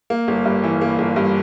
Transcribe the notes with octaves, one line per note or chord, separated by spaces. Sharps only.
A#3
G1
G2
E3
A#3
G1
G2